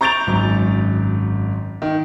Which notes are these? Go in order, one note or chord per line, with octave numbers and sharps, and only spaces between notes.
A#5 C#6 G6 A6 D7 F7
G#1 F#2
D#3